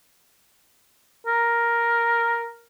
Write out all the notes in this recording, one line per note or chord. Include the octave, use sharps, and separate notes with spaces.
A#4